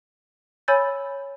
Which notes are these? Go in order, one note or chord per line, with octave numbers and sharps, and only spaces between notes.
C#5 G#5 B5 E6 G6 A6